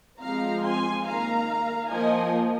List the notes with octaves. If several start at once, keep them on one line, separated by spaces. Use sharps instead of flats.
F3 G#3 C4 F5 A#5
G#5 C6
D#3 A#3 F5 A#5
F3 A#3 D#5 G#5